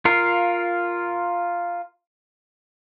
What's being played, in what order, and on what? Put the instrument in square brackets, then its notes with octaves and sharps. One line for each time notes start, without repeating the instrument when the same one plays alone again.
[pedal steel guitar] F4 A#4 F5